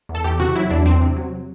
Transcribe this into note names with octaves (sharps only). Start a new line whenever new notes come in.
E2
A4
E2 G4
C3 F#4
F#3 E4
E2 D4
E2 C4
C3
F#3